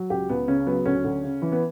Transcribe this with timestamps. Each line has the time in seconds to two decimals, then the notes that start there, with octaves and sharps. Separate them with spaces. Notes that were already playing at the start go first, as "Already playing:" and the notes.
Already playing: F#3
0.10 C#2 G4
0.29 C#2 B3
0.48 C#3 C#4
0.67 F#3 B3
0.86 D2 C#4
1.04 D2
1.23 C#3
1.42 E3
1.52 B3